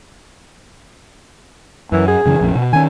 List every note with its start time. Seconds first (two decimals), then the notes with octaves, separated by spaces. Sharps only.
1.92 F#2 E3
2.08 G#4
2.26 F#2 C#3 E3
2.41 A#1 F2 C#4
2.55 B2
2.73 D#3 C#4 G#5